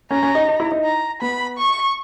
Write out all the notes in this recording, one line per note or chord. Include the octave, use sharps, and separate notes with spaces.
C#4 A#5
C#4
D#4
D#4
E4
D#4
A#5
B3 B5
C#6